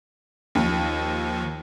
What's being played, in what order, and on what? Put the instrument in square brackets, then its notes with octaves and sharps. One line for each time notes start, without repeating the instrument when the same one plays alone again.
[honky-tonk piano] D#2 [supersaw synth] D#3 F3